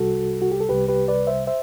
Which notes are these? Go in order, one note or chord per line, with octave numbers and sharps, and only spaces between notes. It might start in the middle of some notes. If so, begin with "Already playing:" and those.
Already playing: C2 C3 G3 F#4 A4
F#4
G4
A4
C2 C3 G3 G4 B4
G4 B4
B4 D5
C5 E5
C5 E5